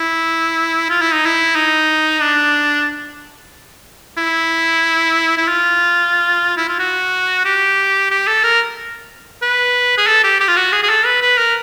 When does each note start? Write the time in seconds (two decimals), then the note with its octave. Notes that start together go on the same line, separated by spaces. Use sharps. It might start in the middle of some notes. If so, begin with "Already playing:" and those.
Already playing: E4
0.90 F4
1.01 E4
1.13 D#4
1.26 E4
1.56 D#4
2.21 D4
4.18 E4
5.37 E4
5.48 F4
6.57 E4
6.69 F4
6.79 F#4
7.45 G4
8.11 G4
8.27 A4
8.43 A#4
9.42 B4
9.98 G#4
10.07 A4
10.24 G4
10.40 G4
10.49 F4
10.57 F#4
10.73 G#4
10.83 G#4
10.89 A4
11.06 B4
11.22 B4
11.38 A#4